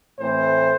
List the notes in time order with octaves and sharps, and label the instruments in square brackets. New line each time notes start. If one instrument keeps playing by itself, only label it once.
[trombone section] A2 E3 A3 C4 C5